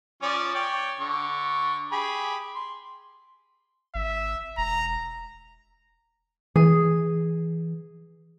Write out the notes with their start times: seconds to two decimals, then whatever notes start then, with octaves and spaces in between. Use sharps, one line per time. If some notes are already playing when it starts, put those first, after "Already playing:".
0.22 F3 C#4 D5
0.55 C#5 D5 G5
1.00 D3 C#6
1.92 G4 G#4 B5
2.55 C6
3.95 G#1 E5
4.57 E1 A#5
6.56 E3 G#4